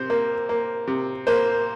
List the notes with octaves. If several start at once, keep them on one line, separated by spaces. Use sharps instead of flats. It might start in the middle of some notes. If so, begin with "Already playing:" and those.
Already playing: C3 C5
A#3
A#3
C3
A#3 C5